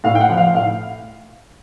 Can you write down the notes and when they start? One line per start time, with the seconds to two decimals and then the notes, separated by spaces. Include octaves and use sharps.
0.04 A2 F5
0.15 G5
0.21 F#5
0.29 F3
0.37 F5
0.55 A2 F5